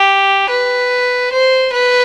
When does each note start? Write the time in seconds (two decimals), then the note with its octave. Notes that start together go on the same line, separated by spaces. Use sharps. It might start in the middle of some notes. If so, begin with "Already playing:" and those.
Already playing: G4
0.49 B4
1.32 C5
1.72 B4